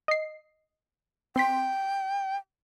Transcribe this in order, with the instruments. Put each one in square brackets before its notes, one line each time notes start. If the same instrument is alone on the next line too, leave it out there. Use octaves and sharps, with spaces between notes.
[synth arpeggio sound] D#5 C7
[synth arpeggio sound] C4 C6 B6 [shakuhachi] G5